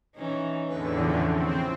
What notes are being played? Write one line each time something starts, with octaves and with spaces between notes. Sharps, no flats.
E3 C#4 D#4
E2 A2 D3 B4
C#3 E3 F3
C4